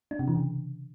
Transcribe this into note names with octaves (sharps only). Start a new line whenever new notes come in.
D4
C3
E3
C#3